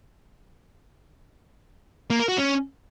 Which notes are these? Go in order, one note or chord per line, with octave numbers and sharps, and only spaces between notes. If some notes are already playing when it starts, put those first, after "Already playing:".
A#3
A#4
F#4
C#4